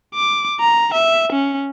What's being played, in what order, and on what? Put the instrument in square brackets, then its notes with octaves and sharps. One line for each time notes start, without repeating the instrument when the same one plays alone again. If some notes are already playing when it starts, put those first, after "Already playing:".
[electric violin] D6
A#5
E5
C#4